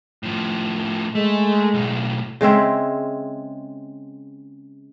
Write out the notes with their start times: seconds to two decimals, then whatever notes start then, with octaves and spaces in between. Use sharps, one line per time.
0.23 A2 F3
1.15 G#3 A3
1.74 B1 A2
2.41 C#3 G#3 C4 E5